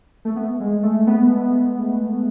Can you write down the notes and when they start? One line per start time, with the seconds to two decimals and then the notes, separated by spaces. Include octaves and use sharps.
0.25 A3
0.36 B3
0.60 G#3
0.83 A3
1.07 B3